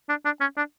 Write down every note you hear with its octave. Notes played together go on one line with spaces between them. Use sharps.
D4
D4
C#4
D4